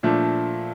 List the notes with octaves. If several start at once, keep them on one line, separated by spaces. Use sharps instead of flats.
A#2 F3 A3 D4